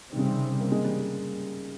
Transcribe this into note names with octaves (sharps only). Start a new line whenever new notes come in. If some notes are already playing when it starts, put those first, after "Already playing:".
C3 D#3 G3 C4
C#3
D#3
A#3
G#3
G3